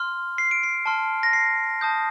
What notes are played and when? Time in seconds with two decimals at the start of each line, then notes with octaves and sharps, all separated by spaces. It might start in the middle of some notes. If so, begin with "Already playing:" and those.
Already playing: C6 F6
0.38 C7
0.51 D7
0.63 C7
0.86 A5 C6 F6
1.23 A#6
1.33 C7
1.81 A5 D#6 G6